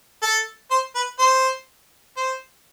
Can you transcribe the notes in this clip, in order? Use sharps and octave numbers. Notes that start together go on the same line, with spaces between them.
A4
C5
B4
C5
C5